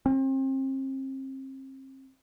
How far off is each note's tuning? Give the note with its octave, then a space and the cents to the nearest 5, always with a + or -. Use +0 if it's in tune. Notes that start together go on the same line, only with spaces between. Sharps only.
C4 +35